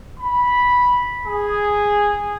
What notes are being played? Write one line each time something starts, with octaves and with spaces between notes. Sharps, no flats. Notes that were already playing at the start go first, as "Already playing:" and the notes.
B5
G#4